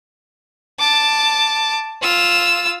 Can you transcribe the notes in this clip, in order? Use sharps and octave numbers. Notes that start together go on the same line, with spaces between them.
A5 D6
F4 E6